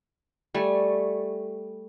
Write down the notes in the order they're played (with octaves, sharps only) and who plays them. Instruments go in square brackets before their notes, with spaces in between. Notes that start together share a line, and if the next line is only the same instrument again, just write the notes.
[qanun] G3 A3 G#5 C#6